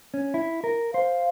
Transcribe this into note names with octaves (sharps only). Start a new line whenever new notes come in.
C#4
E4
A#4
C5 F5